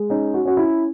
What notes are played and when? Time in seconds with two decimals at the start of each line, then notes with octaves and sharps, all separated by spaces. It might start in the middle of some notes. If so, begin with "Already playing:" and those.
Already playing: G#3
0.10 C#4 D#4
0.34 F#4
0.45 C#4 F#4
0.57 E4